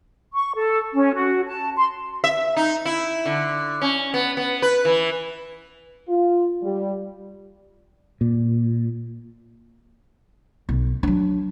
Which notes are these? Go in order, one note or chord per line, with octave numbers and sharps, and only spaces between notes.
C#6
A4
C#4
F#4
A5
C6
E5
D#4
E4
D3
C#4
B3
B3
B4
E3
F4
G3
A#2
B1
F#3 D4